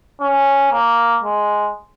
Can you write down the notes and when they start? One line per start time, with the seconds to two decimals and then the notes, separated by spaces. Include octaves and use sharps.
0.21 C#4
0.72 A#3
1.23 G#3